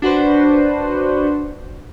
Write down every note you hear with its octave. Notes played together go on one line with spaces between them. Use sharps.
D4 F#4 B4 C5